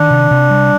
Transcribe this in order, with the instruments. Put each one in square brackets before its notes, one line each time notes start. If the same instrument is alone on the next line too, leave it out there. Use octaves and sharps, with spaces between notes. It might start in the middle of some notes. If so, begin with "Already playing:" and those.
Already playing: [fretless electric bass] D#3 [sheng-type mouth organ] D4
[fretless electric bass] C3
C3
G3